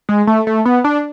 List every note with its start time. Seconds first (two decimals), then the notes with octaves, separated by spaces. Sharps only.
0.09 G#3
0.27 A3
0.47 A3
0.66 B3
0.84 D4